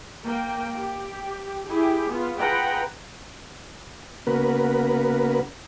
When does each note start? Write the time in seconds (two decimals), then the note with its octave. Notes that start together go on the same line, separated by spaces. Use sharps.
0.25 A#3 G5
0.76 G4
1.67 E4 G4 G#4
2.09 B3 F4
2.38 F4 G#4 B4 F#5 G5 A#5
4.27 C#3 A#3 B3 F#4 A#4 B4